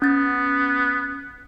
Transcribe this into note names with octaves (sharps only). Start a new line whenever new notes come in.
B3 C#4 A6